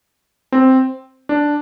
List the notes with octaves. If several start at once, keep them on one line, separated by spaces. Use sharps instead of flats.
C4
D4